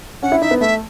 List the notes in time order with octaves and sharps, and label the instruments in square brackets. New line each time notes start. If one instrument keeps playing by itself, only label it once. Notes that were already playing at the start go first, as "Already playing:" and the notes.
[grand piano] C#4 [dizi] F#5
[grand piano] E4
[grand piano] D#4 [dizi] E5
[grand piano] B3
[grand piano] A3 [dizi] E5